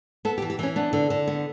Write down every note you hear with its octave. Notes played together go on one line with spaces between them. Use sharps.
B3 A4
G4
E3
G4
E3 C#4
B3 D4
D3
D3
B3